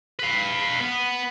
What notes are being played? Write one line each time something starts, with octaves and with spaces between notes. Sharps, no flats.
B4 F5
B3